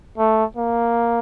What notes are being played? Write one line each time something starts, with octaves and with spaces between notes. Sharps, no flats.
A3
A#3